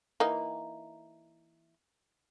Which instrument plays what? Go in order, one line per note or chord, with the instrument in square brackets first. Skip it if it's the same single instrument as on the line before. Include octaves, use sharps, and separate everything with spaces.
[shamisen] E3 A#3 D#4